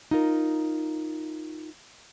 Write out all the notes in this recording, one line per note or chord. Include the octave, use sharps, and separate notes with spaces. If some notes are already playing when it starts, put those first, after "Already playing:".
D#4 F4 A#4